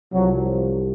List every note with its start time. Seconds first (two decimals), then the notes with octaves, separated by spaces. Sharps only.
0.12 C2 C3 F3 F#3